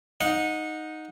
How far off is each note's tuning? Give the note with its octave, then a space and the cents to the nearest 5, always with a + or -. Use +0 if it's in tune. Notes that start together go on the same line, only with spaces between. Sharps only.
D#4 +0 F#5 -25